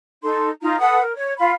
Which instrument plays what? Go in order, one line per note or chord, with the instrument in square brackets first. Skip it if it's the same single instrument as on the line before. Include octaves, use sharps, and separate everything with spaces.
[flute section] D#4 A4 C6
D#4 F4 A#5
A4 B4 F#5 D#6
A#4
C#5
F4 F5 B5